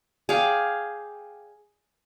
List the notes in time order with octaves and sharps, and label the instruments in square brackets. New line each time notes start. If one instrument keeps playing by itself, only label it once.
[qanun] G#4 D5 F5 G5